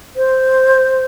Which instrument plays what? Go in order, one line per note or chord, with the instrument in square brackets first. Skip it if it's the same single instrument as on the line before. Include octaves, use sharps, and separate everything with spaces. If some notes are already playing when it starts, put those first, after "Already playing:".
[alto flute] C5